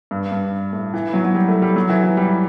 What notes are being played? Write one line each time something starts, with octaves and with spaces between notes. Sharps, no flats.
G2
G2
A2
E3
F#3
F#3
G3
A3
G3
F#3
E3
E3
G3